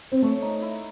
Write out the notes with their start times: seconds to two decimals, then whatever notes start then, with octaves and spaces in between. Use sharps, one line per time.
0.12 C4
0.22 A3 C#5
0.42 D#4
0.62 E4